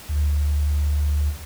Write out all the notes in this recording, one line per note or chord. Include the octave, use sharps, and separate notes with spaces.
D2